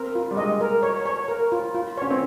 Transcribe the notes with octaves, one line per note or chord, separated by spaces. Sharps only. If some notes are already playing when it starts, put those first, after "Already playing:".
Already playing: C4 A#4
F4
G3
G#3 D#5
A#4
C#5
C#5
A#4
F4
F4
C#4 C#5
C4